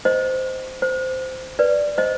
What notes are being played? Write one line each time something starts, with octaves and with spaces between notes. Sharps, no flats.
C5 D#5
C5
B4 D5
C5 D#5